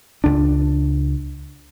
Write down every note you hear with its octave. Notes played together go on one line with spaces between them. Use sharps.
C#2 D4